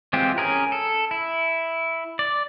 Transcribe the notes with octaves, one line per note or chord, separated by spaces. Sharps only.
E3 G#3 C4 F4 G4
C#4 G#4 A#4
A4
E4
D5